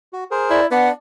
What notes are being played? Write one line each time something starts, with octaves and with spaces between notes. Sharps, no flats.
F#4
G#4 A#4 C5
E4 D5
B3 D4 D5 F#5